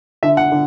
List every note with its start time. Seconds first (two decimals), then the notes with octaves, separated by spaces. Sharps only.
0.23 D3 E5
0.37 F#5
0.52 D3